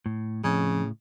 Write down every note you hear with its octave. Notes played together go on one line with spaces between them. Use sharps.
A2
F2 A2 C#3